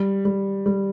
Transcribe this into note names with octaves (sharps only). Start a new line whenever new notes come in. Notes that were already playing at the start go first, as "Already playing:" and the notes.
Already playing: G3
G3
G3